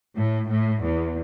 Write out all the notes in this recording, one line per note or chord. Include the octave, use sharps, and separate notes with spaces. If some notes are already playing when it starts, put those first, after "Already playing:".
A2
A2
E2